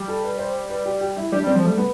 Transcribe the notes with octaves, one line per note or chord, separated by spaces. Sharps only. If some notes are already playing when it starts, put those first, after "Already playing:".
Already playing: G3
A4
B4
C5
B4
G4
G4
E4
G3 D4
G3 C4
F3
G3 A3
B3